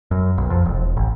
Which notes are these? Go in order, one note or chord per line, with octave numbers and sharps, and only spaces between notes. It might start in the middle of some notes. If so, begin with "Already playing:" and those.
F#2
B1
F2
E1
A1